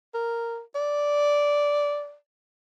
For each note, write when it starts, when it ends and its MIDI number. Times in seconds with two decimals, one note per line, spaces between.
0.14 0.60 70
0.75 2.15 74